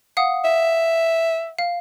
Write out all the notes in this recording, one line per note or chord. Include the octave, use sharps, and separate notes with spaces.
F5 F#5 D#6
E5
F5